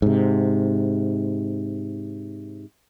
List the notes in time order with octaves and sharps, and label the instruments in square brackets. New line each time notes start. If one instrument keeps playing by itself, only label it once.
[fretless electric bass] G#2 C3